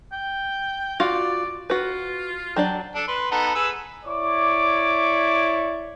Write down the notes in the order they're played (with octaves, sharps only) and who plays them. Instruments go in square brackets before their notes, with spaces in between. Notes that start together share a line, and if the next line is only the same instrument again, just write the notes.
[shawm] G5
[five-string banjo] F4 F#4 F5 [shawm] D5
[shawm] F4 [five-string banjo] F#4 B4
[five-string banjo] F#3 D4 D5 [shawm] G5
[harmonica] D4 A4
B4 C6
B3 D#4 A4
G#4 B4 E6
[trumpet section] E4 C#5 D5 D6